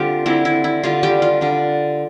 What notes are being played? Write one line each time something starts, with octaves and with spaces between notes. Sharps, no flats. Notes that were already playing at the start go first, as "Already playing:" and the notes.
Already playing: D3 G3 C4 F4 G4
D3 G3 C4 E4
E4
E4
D3 G3 D4 F4
G3 G4
F4
D3 G3 D4